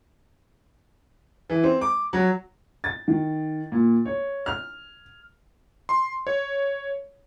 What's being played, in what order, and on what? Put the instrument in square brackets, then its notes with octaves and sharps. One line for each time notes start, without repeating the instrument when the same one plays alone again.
[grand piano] E3
C4
D6
F#3
[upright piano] A6
D#3
A#2
C#5
F6
[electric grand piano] C6
C#5